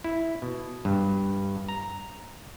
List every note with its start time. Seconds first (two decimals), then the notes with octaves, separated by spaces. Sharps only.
0.04 E4
0.42 B2
0.85 G2
1.68 A#5